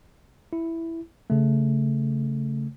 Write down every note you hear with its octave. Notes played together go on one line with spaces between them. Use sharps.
E4
C#3 A3